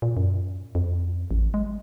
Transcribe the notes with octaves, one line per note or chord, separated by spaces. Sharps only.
A#2
F#2
F2
A1
G#3